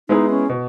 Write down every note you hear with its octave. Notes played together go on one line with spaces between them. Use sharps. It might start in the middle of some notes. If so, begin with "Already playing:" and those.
G#3 B3 D#4 E4 G#4
C#4
B2